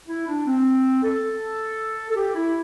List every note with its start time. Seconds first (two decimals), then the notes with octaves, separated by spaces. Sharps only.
0.08 E4
0.28 D4
0.46 C4
1.03 A4
2.11 A4
2.16 G4
2.35 E4